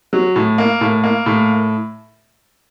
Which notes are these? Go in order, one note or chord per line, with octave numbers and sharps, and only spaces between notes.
F#3
A2
A#3
A2
A#3
A2